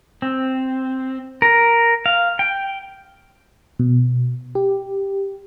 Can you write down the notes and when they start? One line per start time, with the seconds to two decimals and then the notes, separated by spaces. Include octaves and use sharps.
0.22 C4
1.42 A#4
2.06 F5
2.39 G5
3.79 B2
4.55 G4